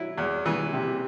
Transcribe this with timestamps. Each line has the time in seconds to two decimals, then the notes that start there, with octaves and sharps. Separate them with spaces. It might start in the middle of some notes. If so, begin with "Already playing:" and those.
Already playing: F#3 E4
0.18 E2
0.46 E3
0.73 C3